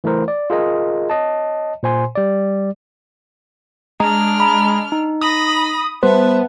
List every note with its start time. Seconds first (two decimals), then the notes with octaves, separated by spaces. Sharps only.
0.04 E3 A3 E4 A#4 C5
0.28 D5
0.50 F4 G#4 A#4 D#5
1.10 C#5 D#5 A5
1.83 A#2 C5 G#5 C6
2.15 G3 D5
4.00 G#3 D4 A#5 F6
4.40 A#5 B5
4.92 D#4
5.21 B5 D#6 A#6
6.03 G3 B3 B4 C5 E5 A5